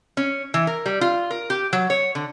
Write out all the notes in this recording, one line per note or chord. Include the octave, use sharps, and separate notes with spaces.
C#4
E3
A#4
G3
F4
A#4
G4
F#3
C#5
D3